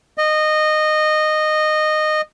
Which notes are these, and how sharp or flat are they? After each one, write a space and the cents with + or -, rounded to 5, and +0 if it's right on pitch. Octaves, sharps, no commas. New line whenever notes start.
D#5 -15